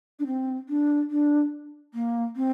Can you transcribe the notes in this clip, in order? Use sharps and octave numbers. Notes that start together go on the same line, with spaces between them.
D4
C4
D4
D4
A#3
C4